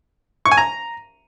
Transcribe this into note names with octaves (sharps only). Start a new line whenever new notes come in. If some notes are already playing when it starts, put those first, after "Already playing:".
C#6
G#5
A#5